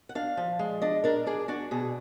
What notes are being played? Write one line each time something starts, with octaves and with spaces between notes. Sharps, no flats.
F#5
D4 F5
F3
G#3
D4 D#5
D4 A#4
D4 G#4
D4 F#4
B2 G#4